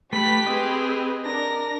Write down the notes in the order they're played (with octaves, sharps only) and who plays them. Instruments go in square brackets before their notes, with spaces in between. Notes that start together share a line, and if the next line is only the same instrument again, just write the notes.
[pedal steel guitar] A3 B5 [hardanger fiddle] G4 [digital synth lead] B4 [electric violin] B6
[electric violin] C4 G#4 [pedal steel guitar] D#5
[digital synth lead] D4 [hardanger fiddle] A#4 [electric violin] A#6